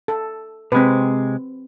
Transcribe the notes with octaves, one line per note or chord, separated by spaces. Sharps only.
A4
C3 G#3 C4 B4